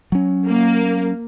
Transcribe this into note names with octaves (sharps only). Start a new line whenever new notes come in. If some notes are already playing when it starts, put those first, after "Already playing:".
F#3 C#4
A#3